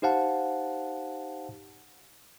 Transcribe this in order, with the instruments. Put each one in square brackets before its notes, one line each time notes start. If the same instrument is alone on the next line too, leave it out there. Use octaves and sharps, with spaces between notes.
[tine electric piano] D#4 G4 C5 F5 F#5 A5